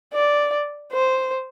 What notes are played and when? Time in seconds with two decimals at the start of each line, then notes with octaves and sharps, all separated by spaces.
0.13 D5
0.92 C5